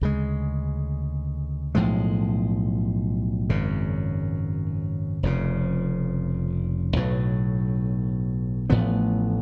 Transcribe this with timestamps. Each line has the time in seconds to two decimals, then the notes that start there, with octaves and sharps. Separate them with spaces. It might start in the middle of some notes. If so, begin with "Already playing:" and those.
0.01 D2 C#3 G#3
1.75 B1 A2 F3 G#3
3.50 G#1 F#2 C#3
5.23 F1 F2 C#3
6.96 B1 A2 F#3
8.70 A1 A2 F3 B3